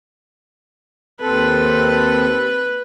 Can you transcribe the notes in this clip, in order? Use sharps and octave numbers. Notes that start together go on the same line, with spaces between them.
D#2 C4 A4 B4